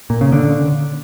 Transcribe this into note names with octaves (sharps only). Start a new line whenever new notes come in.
A#2
C#3
D3